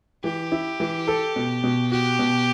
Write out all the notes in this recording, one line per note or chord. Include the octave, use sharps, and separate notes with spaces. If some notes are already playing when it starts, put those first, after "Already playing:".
E3 G4
E4
E3
A4
B2
B2
F#4 G4
B2